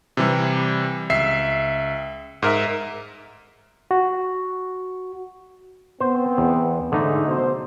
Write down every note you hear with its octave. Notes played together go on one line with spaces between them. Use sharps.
C3 E3 G3
C#2 E5 C7
G#2 A#4 E5
F#4
B3 C4 C5
E2
G#2 D3 A3 D#4
B2 C5